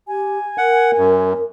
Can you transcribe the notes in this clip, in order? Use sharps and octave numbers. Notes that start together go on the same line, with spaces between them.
G4 G#5
A#4 F#5
F#2